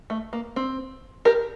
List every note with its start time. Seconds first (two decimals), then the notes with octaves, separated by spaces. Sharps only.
0.10 A3
0.33 A#3
0.56 C4
1.25 G4 A#4